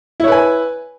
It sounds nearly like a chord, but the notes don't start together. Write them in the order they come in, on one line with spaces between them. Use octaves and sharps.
E4 C#5 B4 G#5